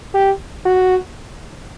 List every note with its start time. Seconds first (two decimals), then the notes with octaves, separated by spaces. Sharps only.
0.14 G4
0.65 F#4